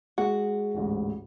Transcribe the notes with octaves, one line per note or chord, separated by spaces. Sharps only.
G#3 F#4
A1 D2 G#2